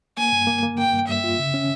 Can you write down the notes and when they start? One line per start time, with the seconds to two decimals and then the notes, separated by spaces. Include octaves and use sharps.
0.17 A#3 G#5
0.32 G2
0.47 A#3
0.63 A#3
0.78 A#3 G5
0.92 G2
1.08 G2 E5
1.24 F4
1.39 C#3
1.54 C#4